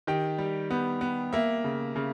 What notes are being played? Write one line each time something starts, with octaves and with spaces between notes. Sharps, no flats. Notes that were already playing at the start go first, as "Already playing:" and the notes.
D#3 G4 G5
G3
B3
B3
A#3 E5
C#3
C#3